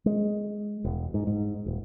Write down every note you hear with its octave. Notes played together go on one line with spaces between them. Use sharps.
G#3
E1
G#2
G#2
D#1